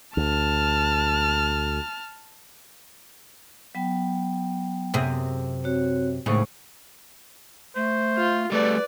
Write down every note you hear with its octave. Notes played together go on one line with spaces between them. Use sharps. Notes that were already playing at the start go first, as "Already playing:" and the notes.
D2 A5 F6
F#3 B3 G5
F#2 C3 G#4
C4 F#4 C#5
D#2 A2 C#3 G#3 C5 C#6
A3 C5
F4
G3 A3 B4 D5